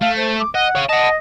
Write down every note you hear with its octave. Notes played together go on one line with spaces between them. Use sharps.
A3 F5
C5
D6
D#5 F#5
C#5 F5
D#5 F#5 A5